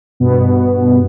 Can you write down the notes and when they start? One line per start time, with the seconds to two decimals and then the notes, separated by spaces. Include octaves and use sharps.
0.20 G2 B2 B3